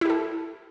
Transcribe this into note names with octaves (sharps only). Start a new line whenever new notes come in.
E4 G4 A4